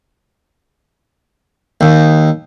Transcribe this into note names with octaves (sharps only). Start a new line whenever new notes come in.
D#2